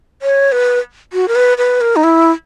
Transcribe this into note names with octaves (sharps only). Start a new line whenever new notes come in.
C#5
B4
F#4
A#4
B4
B4
A#4
D#4
E4